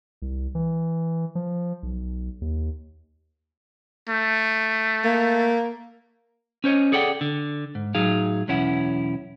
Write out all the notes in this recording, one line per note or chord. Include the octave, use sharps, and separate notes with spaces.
C2
E3
F3
B1
D#2
A3
A#3
C#4 C5 C#5 D#5
G#4 A4 D5 F#5 G5
D3
G#2
A2 F#3 D#4 G#4 F5
B1 E2 C#4 E4 F#5